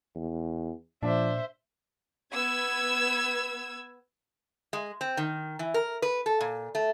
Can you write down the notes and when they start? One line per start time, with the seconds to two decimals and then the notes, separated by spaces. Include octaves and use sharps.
0.16 E2
1.03 A#2 F3 D4 C5 E5
2.32 B3 E6 G#6
4.73 G#3
5.01 C4
5.17 D#3
5.59 E3
5.74 A#4
6.02 B4
6.26 A4
6.41 A#2
6.75 A3